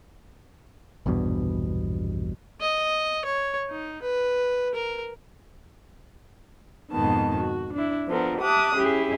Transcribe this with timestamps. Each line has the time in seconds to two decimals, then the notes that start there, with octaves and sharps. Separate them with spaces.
1.06 A#1 E2 G2 B2
2.61 D#5
3.25 C#5
3.70 D#4
4.02 B4
4.74 A#4
6.91 F2 G#2 B2 D#3 B3 A5
7.36 F#4
7.73 D4 E4
8.07 F3 B3 D4 F4 A4 A#4
8.38 G4 E5 A5 D6 D#6 F#6
8.75 C#4 E4 G4 G#4